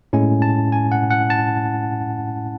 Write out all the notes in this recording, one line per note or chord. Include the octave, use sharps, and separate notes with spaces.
A2 G#3 C#4 E4 G#5
A5
G#5
F#5
F#5
A5